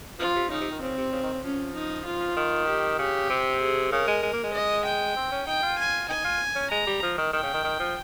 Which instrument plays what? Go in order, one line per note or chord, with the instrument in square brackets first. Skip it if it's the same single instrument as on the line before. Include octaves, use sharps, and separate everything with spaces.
[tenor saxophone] F3 [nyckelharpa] F4
[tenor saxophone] C3
[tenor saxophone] C#3 [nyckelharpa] D#4
[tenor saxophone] C3
D#3
[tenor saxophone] C#3 [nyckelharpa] C4
[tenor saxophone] C3
C#3
D#3
C#3
[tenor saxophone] F3 [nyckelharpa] C#4
[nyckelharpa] D#4
F4
[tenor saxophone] D#3
[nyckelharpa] G4
[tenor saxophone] C#3 [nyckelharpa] G4
[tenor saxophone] C3
[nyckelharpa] G#4
[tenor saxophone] C#3 [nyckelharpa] A#4
[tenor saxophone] G#3
G#3
A#3
G#3
[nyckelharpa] D#5
G5
[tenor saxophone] C4
C#4
[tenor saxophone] D#4 [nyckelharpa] G5
[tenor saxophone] F4
[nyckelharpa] G#5
[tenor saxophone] D#4 [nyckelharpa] G#5
[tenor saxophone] F4
C#4
[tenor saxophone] G#3 [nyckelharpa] A#5
[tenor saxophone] G3
F3
D#3
[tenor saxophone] D#3 [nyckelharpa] G5
[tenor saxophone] C#3
D#3
D#3
F3